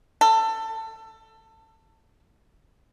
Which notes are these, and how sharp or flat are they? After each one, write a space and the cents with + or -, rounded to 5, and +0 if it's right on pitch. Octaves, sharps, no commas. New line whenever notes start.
A4 +20